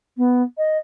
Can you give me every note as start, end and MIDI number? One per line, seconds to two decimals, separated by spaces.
0.17 0.42 59
0.58 0.78 75